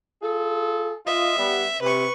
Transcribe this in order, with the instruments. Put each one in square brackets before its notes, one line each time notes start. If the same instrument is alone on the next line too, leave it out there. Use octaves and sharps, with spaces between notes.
[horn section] F4 G#4 A4
[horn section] F4 D#5 [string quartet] E5
[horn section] G3 B3
[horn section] C3 [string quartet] B4 C#6